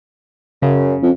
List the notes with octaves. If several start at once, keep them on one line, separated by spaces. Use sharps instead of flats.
F#2 C#3
F2